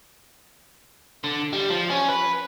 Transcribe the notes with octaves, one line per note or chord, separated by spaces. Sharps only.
D3
G3
F3
C#4
B4